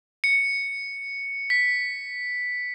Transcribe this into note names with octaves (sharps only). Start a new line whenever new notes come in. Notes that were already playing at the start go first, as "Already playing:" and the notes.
C#7
B6